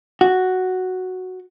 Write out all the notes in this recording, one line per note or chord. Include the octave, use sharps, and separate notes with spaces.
F#4